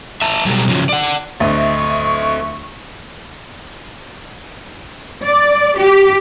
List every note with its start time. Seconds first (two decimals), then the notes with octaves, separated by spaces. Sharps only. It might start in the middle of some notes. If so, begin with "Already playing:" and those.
0.22 E5 A5 A#5
0.46 B2 F#3 G3 A4 A#5
0.69 C#3 F3 F#3
0.89 D5 F#5
1.40 D2 A4 D#5 E5 C#6
5.23 D5
5.78 G4